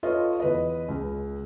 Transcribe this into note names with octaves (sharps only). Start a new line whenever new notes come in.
F4 A4 B4 C#5 D#5 F5
E2 B4 D#5
C#2